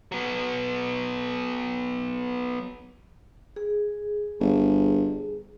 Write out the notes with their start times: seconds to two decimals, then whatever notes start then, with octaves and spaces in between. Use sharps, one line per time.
0.12 F#3 B3
3.56 G#4
4.41 G1